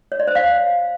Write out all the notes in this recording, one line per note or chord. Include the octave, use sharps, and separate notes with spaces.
C#5
D5
C5
F5